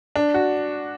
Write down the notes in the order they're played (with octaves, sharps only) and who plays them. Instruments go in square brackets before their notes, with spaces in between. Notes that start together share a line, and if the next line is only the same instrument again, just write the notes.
[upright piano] D4
F#4